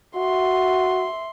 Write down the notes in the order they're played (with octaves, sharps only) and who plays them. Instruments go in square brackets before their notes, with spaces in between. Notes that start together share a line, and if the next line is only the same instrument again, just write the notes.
[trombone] F#4 [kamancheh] E5 C6